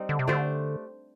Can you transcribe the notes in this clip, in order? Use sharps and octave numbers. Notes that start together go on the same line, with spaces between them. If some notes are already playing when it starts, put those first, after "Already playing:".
Already playing: G3 C4 D#4
D3
C3
D3 A3 D4 G4 C5